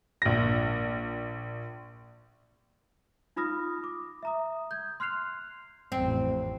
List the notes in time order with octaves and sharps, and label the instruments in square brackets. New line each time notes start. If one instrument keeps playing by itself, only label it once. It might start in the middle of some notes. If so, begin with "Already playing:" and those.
[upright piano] A#1 A#6
[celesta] D#4 F4 B5 D#6 F6 A#6
D6
E5 A#5 D#6
G6 G#6
C6 F6 F#6 C7 F7
[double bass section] A1 F2 [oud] C4